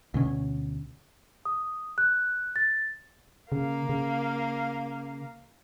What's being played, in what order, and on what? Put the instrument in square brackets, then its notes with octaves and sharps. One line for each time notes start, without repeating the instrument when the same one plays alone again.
[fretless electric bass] D2 B2 C#4
[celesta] D#6
F#6
A6
[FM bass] C#3 [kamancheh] A#3 F5
[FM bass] C#3